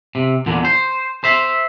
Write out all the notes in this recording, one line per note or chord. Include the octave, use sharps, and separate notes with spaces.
C3
E2 A#2 D3
C5
C5 E5